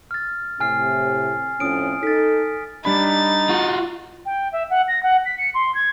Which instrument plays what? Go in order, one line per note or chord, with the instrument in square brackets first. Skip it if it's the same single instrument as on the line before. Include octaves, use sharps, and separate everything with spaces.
[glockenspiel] F6 A6
[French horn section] A2 C3 [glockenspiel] G#5 F6 C7
[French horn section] F2 A2 C#4 [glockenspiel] D#6 D7
[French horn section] D#4 A4 [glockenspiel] A6 B6
[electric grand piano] G3 D4 B5 [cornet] D#4 [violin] A6
[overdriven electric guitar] F4 F#4
[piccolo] G5
E5
F#5
A#6
F#5
B6
C#7
C6
G#6